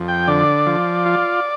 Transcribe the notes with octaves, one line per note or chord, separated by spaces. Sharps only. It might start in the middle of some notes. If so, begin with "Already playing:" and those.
Already playing: F2
G5
D3 D5
F3
F4